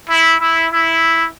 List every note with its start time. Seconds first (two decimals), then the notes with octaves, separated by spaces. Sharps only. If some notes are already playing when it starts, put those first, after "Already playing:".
0.10 E4
0.41 E4
0.71 E4